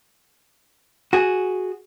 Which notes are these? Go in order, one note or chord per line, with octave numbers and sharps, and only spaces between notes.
F#4 G#4